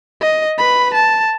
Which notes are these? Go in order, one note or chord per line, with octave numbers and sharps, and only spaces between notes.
D#5
B4 B5
A5